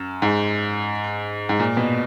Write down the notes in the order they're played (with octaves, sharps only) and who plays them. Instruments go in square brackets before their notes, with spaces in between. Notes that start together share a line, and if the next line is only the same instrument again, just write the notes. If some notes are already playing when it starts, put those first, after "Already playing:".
Already playing: [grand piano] F#2
G#2
G#2
A#2
B2